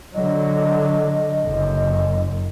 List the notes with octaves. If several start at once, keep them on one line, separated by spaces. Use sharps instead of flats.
D3 F#3 D#5
F#1 F#2